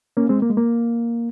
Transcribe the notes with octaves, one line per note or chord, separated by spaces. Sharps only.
A#3 C#4
G#3 C4
A#3
G#3
A#3